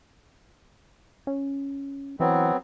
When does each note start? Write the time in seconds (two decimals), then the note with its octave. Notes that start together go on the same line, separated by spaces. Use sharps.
1.27 C#4
2.20 E3 F#3 B3 C4